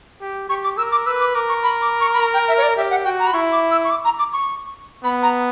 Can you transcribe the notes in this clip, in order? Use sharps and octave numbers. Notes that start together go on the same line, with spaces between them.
G4
G4 C#6
D6
A#4 E6
D6
B4 E6
D6
A#4 D6
C#6
B5
D6
C#6
B5
A#5
G5
E5
C#5
D5
G4 E5
F#5
F#4 G5
A#5
B5
E4 C#6
D6
E6
C#6
D6
A#5
D6
C#6
B3 B5
A#5